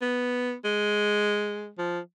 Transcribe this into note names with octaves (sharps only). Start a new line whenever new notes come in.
B3
G#3
F3